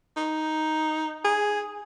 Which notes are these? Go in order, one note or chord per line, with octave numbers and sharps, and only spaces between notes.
D#4
G#4